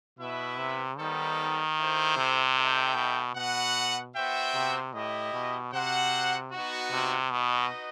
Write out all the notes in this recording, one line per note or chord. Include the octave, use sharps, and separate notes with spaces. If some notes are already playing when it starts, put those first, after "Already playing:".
B2 B3 E4 B4 E5
C3
D#3 G3 B3 D#4 A4 C5
E4 A4 C5
C3
D#4 A4 E5 G5
B2
B2 F#4 B4 F#5
B3 F#4 C5 E5 G5
C3
A2 E4 G4 D#5
B2
C3 F#4 C5 F#5
B3 D#4 F#4
C3
B2 D#4 F#4 B4 D#5